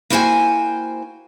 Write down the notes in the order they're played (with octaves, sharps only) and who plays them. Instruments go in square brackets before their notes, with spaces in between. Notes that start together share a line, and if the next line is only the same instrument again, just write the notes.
[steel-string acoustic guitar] A#3 E4 F#4 C5 G5 G#5